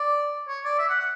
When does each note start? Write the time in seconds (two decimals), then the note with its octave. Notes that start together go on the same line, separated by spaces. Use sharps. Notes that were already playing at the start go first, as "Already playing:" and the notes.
Already playing: D5
0.48 C#5
0.64 D5
0.79 E5
0.89 F#5
0.99 F#5